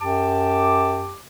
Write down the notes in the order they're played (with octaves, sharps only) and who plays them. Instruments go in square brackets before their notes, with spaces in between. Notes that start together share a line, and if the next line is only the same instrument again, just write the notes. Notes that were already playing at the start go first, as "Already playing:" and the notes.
[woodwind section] F#2 G4 A5 D6